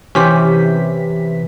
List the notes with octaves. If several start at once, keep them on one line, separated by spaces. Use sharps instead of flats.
C3 E3 C#4 G4 C5 B6